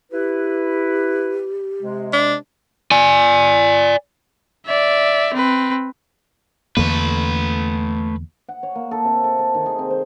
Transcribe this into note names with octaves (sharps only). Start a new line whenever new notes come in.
E4 G4 B4
C3 G#3
D4
D5 G#5
D5 E5
C4 B4
E2 D3 A3 A#3 B4
F#5
C#5
A#3
A4
C3
A4
A4
D#3
G#4
C4
C5